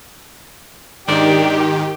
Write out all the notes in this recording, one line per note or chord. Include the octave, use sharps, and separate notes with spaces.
G#2 D#3 D4 D#4 G4